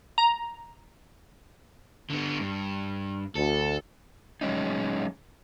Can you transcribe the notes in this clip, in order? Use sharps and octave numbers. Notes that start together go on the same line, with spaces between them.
A#5
D3 B3
G2
D2 A4
F#3 G#3 C#4 D#4